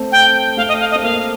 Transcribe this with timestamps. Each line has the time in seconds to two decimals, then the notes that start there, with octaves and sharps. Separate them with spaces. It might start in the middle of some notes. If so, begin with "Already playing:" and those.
Already playing: A3 C4
0.12 G5
0.57 A3 F5
0.68 D#5
0.80 F5
0.91 D#5
0.95 C4
1.02 A#3 F5